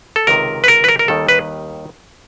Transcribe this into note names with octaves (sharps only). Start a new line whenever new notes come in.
A4
C#2 C3 D#3 A#4
B4
A#4
B4
A#4
A#4
D#2 D#3 G3 A4
B4